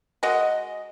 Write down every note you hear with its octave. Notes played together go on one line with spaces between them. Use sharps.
G#3 F#4 A#4 D#5